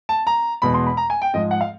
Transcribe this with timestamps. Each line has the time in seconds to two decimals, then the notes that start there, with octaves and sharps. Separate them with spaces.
0.09 A5
0.27 A#5
0.62 E2 B2 G#3 B5
0.74 C6
0.86 B5
0.97 A#5
1.10 G#5
1.22 G5
1.33 G#2 F3 G#3 D#5
1.51 F#5
1.61 F5